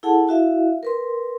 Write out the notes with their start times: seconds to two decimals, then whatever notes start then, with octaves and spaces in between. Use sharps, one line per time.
0.03 E4 G#4 A4 F#5 A5
0.27 E4 F#4 E5 F5
0.83 A#4 B4 C6